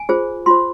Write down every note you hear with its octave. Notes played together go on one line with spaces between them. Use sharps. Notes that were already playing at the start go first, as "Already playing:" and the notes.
Already playing: G#5
F4 G#4 C5
F4 C5 C6